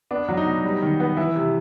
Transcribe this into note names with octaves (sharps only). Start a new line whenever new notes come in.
B3 D4
F#3
D#4
B2
G3
D#3
B3
E3 E4
C3